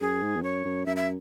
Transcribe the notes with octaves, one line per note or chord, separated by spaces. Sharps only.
F#2 G#4
G#2
E2
F#2 C#5
F#2
F#2 E5
E5